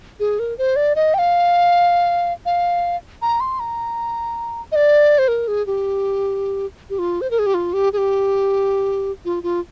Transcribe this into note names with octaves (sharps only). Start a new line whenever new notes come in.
G#4
A#4
C5
D5
D#5
G5
F5
F5
A#5
C6
A#5
D#5
D5
C5
A#4
G#4
G4
G4
F4
C5
A#4
G#4
G4
F4
G4
G#4
G4
F4
F4